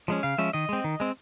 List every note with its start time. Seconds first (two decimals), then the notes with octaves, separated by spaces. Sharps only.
0.08 F3 G#3 C#4
0.23 C#3 F5
0.38 F3 G#3 C#4 E5
0.53 D#3 D#5
0.69 G#3 C4
0.84 D#3
1.00 G#3 C4